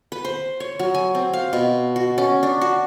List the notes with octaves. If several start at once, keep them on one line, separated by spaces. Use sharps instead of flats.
B4
C5
C#5
F#3
G#5
C4
F5
B2
F#4
C#4
D4
F#4